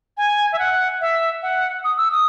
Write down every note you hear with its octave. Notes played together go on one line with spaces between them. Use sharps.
G#5
E5
F#5
E5
F#5
D#6
E6
D#6